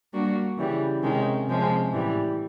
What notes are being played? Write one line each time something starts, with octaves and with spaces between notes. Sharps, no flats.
G3 A#3 D4 F#4
C#3 E3 G3
C3 D#3 G#3 C#4
C3 F3 G#3 C#4
A2 E3 G3